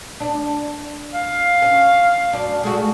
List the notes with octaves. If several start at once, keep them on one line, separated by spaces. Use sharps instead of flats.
D4
F5
C#4
F#2 D4
G#3 A3 F#4